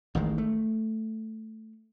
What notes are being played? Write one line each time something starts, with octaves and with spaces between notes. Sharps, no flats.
A1 D#3 G#3
A3